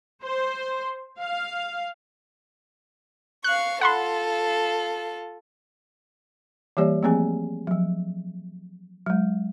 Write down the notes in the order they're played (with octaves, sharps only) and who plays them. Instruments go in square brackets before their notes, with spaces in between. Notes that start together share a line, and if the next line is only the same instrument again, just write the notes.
[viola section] C5
F5
[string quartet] F5 C#6 [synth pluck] F#6
[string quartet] F4 A4 [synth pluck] F#5 B5 C6
[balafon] E3 G3 A#3 G4 C#5 D5
F3 A3 A#3 C4 G#4 G#5
F3 F#3
F#3 G#3